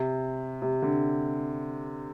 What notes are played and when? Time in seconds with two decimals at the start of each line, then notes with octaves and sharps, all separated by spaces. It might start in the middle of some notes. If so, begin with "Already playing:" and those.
Already playing: C3
0.62 C3
0.82 D3